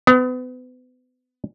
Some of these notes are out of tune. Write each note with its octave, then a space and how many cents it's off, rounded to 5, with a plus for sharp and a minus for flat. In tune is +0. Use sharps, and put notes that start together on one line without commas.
B3 +35